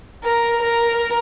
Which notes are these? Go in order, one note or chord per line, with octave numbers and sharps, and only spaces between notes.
A#4
A#4